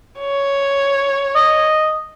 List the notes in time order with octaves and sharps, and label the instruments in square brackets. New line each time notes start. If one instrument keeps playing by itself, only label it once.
[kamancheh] C#5
[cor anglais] D#5